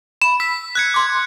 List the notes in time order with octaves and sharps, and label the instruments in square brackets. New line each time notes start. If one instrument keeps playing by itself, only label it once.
[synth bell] B5 [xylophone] E7
[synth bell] E6 [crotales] B6
[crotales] F#6 G#6 C#7
[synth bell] C6 D6